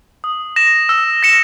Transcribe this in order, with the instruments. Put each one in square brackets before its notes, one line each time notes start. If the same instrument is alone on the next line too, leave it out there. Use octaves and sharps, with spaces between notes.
[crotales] D#6
A#6 E7
E6
A#6 C#7 E7